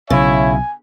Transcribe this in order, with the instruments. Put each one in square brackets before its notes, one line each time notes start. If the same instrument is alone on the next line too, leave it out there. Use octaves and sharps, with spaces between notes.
[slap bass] B1 [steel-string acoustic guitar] C#3 [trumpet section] E4 C#5 E5 [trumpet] G#5